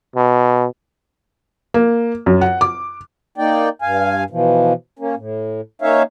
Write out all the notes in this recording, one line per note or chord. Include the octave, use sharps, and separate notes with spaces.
B2
A#3
F#2
F#5
D6
A#3 D#4 D5 G5
G2 F5 G#5
B2 E3 F3
A#3 C#4
A2
A#3 C#4 D#4 C#5 E5 F5